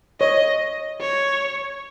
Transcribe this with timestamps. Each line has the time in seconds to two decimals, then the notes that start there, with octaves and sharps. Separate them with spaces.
0.20 C#5 D#5
1.00 C#5